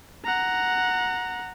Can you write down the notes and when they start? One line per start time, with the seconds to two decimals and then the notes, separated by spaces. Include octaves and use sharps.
0.25 F#5 A#5